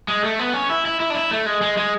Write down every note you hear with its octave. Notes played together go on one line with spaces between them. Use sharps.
G#3
A3
B3
C#4
E4
E4
E4
D4
E4
A3
G#3
G#3
G#3